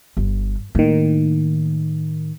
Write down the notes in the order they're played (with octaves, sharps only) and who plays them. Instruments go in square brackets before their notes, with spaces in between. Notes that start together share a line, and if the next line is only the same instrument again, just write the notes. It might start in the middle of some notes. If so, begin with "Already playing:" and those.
[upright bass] G1
[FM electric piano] A2 D#3 [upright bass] A#3